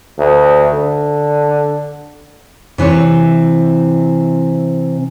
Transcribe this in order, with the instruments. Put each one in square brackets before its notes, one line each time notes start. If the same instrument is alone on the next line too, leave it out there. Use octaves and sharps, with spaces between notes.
[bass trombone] D2
D3
[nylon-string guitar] C3 E3 C4 C#5